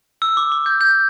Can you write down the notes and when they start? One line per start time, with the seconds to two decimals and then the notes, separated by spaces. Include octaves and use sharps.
0.22 E6
0.37 D6
0.52 D6
0.66 G6
0.81 G6